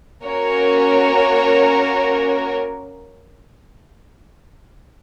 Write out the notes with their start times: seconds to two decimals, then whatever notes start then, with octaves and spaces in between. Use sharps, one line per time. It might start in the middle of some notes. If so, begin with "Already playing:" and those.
0.24 A#3 C#4 F#4 A#4 C#5